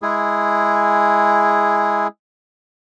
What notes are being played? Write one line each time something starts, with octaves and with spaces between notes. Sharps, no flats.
G#3 E4 G#4